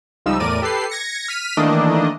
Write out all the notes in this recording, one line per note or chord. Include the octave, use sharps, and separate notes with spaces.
C#2 F3 G3 D#4 E6
E2 A2 A#4 D5 D#7
G4 A4 B4 C7
G#6 A#6 C#7
F6 B6 D#7
D#3 E3 A3 A#3 D4 D#5